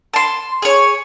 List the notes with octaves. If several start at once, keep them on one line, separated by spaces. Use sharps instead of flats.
A5 C6
G#4 C#5